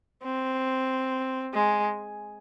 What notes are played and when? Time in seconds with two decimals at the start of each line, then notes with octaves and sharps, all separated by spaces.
0.24 C4
1.54 G#3